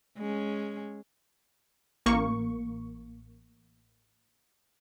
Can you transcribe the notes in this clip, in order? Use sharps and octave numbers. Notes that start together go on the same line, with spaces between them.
G#3 C#4
A1 A#3 C#6